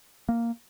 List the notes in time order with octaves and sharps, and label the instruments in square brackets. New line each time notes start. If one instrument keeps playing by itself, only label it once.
[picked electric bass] A#3